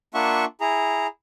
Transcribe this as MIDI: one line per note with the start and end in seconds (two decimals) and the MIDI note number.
0.14 0.45 58
0.14 0.45 62
0.14 0.45 65
0.14 0.45 76
0.14 0.45 78
0.14 0.45 85
0.61 1.07 64
0.61 1.07 68
0.61 1.07 82